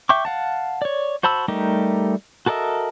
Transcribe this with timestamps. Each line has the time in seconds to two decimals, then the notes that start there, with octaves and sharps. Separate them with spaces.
0.09 E5 G5 C#6 D6
0.25 F5 F#5 A5
0.82 C#5 D5
1.23 F#4 C5 A5 B5 E6
1.48 G3 A3 D#4 G4 A#4
2.46 F#4 A4 A#4 D#5 E5